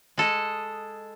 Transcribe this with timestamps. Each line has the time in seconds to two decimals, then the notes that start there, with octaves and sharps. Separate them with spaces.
0.18 G#3 A4 D#5